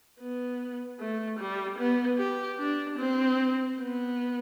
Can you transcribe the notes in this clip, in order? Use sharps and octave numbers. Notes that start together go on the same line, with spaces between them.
B3
A3
G3
B3
G4
D4
C4
B3